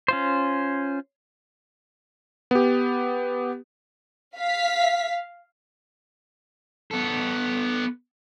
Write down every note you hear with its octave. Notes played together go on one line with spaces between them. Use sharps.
C#4 F4 C5
B3 G4
F5 B6
B3 A4